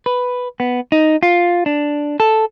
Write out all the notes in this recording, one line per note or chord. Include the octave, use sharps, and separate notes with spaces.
B4
B3
D#4
F4
D4
A4